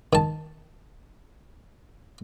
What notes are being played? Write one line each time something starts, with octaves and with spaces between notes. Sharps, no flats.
D#3 A5